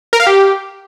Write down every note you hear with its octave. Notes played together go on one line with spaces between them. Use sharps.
A#4
F5
G4